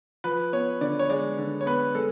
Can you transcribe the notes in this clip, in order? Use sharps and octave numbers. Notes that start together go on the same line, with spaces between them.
F3 B4
B3 C#5
D3 D5
C#5
G#3 D5
D3
C#5
B3 B4
G#3 A4